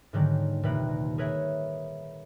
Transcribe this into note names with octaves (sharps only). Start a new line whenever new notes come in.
G#2 D3 D#3 F#3 G3 A#3
D#1 C3 A#3 B4 A#5
G#4 A#4 B4 C#5 E5